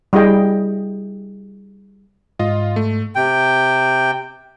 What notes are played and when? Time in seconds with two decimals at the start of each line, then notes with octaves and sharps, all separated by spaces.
0.13 G3 E4 G#4 D#5 G5
2.39 G#2 F4 D#5
2.76 A3
3.15 C3 G5